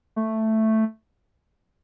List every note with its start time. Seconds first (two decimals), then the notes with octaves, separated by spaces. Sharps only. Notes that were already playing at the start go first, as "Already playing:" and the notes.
0.16 A3